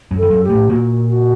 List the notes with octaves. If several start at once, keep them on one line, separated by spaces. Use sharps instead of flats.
F#2 F#3
D#3 A4
F#2 F#3
G4
A2 A3
A#2 A#3 F#4
F#4